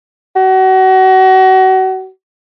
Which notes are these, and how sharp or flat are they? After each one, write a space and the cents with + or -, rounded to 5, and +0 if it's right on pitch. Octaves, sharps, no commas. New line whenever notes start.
F#4 +30